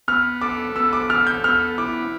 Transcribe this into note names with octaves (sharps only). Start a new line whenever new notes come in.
B3 F6
A4 D6
B3 E6
D6
A4 F6
G6
B3 F6
E4 D6